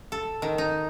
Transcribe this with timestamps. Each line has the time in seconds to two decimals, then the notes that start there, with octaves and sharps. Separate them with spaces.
0.12 A4
0.42 D#3
0.58 D#4